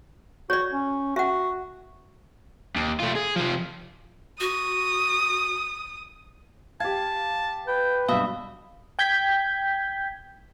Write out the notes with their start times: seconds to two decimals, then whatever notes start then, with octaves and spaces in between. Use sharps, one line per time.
0.50 F#4 C#5 D5
0.72 C#4
1.16 F#4 E5 F#5
2.76 D#2
3.00 A3 F4
3.15 G#4
3.36 C3 F3
4.40 F#4 D#6
6.80 G4 F5 A5 G#6
7.68 B4 G5
8.09 G2 B2 E5 F5 B5 D#6
8.99 G5 G6 G#6 B6